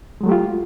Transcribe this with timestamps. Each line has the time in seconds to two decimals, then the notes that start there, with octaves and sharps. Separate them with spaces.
0.21 G#3
0.23 F#3
0.26 A3
0.29 G4
0.32 F4